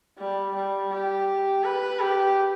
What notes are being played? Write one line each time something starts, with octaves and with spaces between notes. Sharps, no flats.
G3
G3
G4
B4
G4